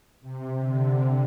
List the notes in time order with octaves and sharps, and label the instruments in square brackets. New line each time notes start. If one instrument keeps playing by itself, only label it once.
[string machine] C3
D3